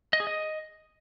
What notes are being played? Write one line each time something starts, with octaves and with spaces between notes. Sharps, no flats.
D#5
G#4
D#5